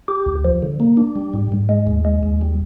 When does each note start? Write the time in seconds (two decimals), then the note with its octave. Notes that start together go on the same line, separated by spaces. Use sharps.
0.08 G4
0.26 D2
0.45 F3
0.62 D3
0.80 A#3
0.97 D4
1.15 G3
1.34 G#2
1.52 G#2
1.69 G#3
1.87 D#2
2.05 G#3
2.23 D#2
2.41 G3